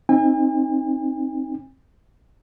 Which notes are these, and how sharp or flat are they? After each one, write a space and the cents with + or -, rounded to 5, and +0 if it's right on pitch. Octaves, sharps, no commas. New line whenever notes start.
C4 +20 D#4 +5 G#5 -40